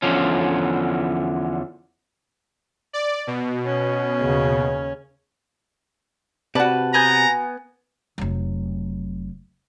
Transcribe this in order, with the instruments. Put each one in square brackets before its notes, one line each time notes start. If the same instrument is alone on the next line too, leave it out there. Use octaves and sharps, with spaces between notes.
[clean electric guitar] E2 D3 F3 C#4
[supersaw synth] D5
B2
[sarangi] C#4
[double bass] D#2 C#3
[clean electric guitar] C3 [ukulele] F#4 D5 [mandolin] B4 A5
[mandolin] B3 G#5 G6 [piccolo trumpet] A#5
[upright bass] F1 F#3